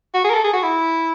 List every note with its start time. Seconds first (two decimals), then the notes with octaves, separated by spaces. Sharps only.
0.14 F#4
0.24 G#4
0.30 A#4
0.34 A4
0.44 G#4
0.53 F#4
0.63 E4